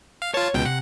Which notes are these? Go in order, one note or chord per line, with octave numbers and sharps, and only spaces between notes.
F5
F4 C#5 A5
C#2 B2 G5
C3 F#5